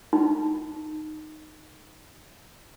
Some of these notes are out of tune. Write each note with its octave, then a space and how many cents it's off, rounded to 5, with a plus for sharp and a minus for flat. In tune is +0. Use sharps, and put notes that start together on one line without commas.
D#4 -10